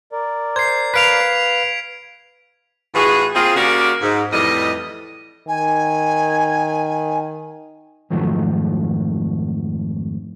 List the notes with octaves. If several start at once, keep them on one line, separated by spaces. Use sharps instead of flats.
A#4 D5
C5 G#6 C7
B4 F5 B6 D7 F7
A2 E3 F4 F#4 G#4
A#3 C4 F4 G#4
C#3 A#3 F#4 G4 A#4 D5
G#2
F2 A2 E3 G3 D#5
D#3 G#5
F2 G#2 D#3 F3 F#3 A3